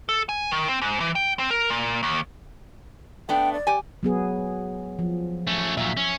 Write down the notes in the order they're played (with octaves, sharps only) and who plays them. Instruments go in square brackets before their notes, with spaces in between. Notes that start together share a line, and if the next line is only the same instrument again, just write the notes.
[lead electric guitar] A4
G#5
D#3
C4
G#2
E3
G5
C4
A#4
A#2
D#2
[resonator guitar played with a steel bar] A3 B3 D4 [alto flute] G5
[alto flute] D5
[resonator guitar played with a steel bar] G4 G#5
[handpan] F#3 B3 G#4
F3
[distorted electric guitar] A3 C#4
[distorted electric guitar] A#2 F#3 [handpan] E5
[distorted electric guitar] C#4